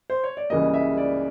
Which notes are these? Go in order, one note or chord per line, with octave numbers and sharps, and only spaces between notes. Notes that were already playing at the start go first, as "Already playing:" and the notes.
C5
C#5
D5
C#2 C#3 E3 G3 A#3 D#5
E5
D5